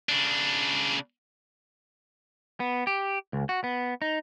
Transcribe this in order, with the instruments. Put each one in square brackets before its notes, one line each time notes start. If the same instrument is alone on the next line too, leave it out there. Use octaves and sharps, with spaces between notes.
[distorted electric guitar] C#3 D4
[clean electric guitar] B3
G4
C#2
F#4
B3
D#4